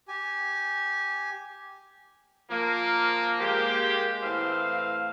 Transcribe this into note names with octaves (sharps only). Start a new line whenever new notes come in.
G4 G#5
F3 A#3
G#3 A#3 G4
A2 E3 C4 F5